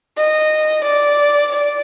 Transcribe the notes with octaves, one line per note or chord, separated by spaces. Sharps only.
D#5
D5
D5